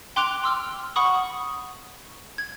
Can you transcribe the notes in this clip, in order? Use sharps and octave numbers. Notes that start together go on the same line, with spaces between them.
G5 C6 D6 F#6 D7 F7
C6 E6 F6
F#5 B5 C#6 D#6
G#6